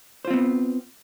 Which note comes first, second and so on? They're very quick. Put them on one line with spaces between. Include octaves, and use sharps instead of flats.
C5 F4 C4 B3